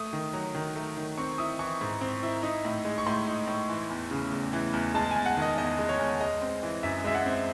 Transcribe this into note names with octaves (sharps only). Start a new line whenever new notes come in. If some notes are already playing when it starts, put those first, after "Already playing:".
Already playing: A3 D#6
D#3
F#3
D#3
A3
D#3
C4 C#6
E4 D#6
E3 C#6
G#2
C4
E4
D#4
A2
G#3
C#6
A2 C6
D#4
A2
E3
E2
C#3
E2
E3
E2
G#3 A5
E2 G#5
F#5
D#3 D#5
E2 D#5
G#3
C#5
E2
G#3 D#5
C4
E3
F#2 E5
G#3 E5
F#5
C4